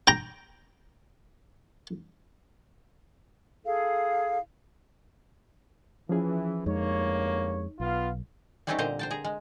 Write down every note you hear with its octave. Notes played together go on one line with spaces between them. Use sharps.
G5 A#5
E4 G#4 A4 F5
E3 F3 C#4 G#4
G1 F2 G#3 A#3 D#4 C#5
B1 B3 F4 F5
G3 A3 C4 C#4 D#4 G4
A#2 D3 G4 C5 D#5 A#5
C5 G5 A5
G#4 A#5
G#3